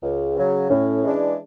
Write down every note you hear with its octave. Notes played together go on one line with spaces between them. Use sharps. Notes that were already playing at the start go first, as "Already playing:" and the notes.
C#2
C#3 F#3
A2 C#4
E3 G#3 D4